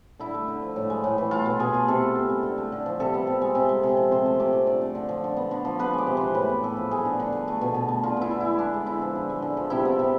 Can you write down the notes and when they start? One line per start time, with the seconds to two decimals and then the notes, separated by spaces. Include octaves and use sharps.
0.19 D3 E4
0.34 A3
0.48 D3
0.62 F3
0.76 A2
0.90 G#3
1.04 A2
1.18 E3
1.31 A3 F4
1.46 B2
1.59 B2 G#4
1.74 A3
1.88 C3 A4
2.02 B3
2.15 C3
2.29 G#3
2.43 D3
2.58 A3
2.72 D3
2.86 F3
3.00 C3 A4
3.14 B3
3.27 C3
3.42 G#3
3.55 C3
3.69 G#3
3.83 C3
3.97 F3
4.11 C3 C5
4.26 A3
4.40 C3 D5
4.53 F3
4.67 D3 D5
4.82 A3
4.95 D3
5.09 F3
5.24 D3
5.37 B3
5.51 D3
5.65 F3
5.79 B3 B4
5.93 G#3 D5
6.07 C3
6.17 E3 C5
6.35 A2 B4
6.49 B3
6.63 A2 A4
6.77 F3
6.91 A3 G#4
7.05 D3
7.20 D3
7.32 A3
7.48 A3
7.61 B2
7.74 B2
7.88 A3
8.03 D3 F4
8.17 B3 E4
8.31 D3
8.40 G#3 E4
8.59 B3 D4
8.74 G#3
8.86 D3 E4
9.01 F3
9.15 D3
9.29 G#3
9.42 D3
9.57 F3
9.70 C3 E4
9.85 B3
9.99 C3